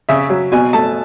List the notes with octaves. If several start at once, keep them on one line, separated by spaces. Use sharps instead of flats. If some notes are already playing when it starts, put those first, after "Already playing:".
C#3 E5
F#3
B2 G#5
A3 A5